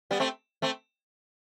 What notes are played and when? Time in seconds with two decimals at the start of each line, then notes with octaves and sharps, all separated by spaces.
0.11 G3 B3
0.20 A3 C4
0.62 A3 C4